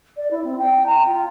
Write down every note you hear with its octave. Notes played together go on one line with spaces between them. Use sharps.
D5
E4
C4
G5
A#5
F4